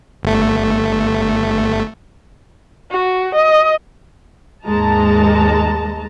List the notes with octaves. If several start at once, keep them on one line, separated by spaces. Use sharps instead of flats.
G1 A3
F#4
D#5
D#2 G#2 G#3 D#5 A5 A#5